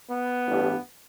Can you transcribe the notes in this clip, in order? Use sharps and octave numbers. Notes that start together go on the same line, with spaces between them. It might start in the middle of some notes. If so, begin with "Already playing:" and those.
B3
A1 G2 E3 G3